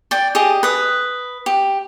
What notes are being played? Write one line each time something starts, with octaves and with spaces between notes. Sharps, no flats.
D5 G5
G4 G#4 D#5
B4 D#6
G4